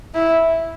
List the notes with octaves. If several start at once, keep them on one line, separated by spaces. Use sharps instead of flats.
E4